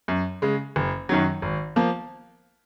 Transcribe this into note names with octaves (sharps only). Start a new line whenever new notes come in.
F#2
C#3 G#3
F#1
F#2 D#3 F#3
G#1
F3 A#3